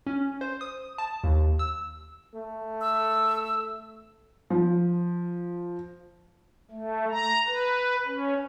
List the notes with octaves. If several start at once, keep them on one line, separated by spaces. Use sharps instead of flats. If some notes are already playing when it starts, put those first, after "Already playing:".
C#4
C5
D#6
A5
D#2
E6
A3
E6
F3
A3
A#5
B4
C#4